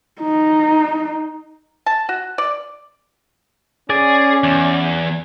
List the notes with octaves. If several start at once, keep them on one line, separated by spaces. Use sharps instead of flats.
D#4
A5
F#4
D5
C#4 G#4 D5
E2